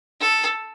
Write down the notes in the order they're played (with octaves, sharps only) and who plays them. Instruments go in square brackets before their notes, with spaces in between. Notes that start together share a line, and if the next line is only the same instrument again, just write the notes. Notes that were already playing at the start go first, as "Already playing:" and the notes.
[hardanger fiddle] A4